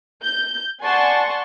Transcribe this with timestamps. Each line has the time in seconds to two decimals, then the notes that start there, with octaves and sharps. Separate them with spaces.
0.22 G6
0.83 D5 F#5 G#5 A5 C6 C#6